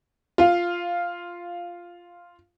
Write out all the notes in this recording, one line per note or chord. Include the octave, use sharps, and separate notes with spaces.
F4 F5